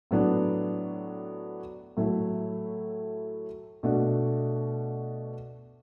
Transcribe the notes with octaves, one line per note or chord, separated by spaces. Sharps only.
A2 F#3 B3 D4
A2 F#3 A3 E4
B2 A3 D4 F#4